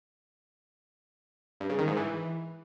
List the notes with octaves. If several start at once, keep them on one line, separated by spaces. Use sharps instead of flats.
G2
C#3
D#3
G#2
E3